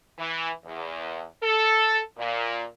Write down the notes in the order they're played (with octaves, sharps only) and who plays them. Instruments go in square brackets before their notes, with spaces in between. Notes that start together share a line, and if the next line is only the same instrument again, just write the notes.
[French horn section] E3
E2
A4
A#2